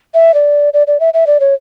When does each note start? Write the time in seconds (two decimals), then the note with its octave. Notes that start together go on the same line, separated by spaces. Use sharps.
0.14 E5
0.34 D5
0.74 D5
0.87 D5
1.00 E5
1.14 E5
1.27 D5
1.40 C#5